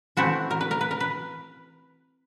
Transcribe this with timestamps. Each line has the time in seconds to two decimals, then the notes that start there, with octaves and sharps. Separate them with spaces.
0.17 E3 A3 C4 E4 F#4
0.51 A#4
0.61 B4
0.71 A#4
0.81 B4
0.91 A#4
1.00 B4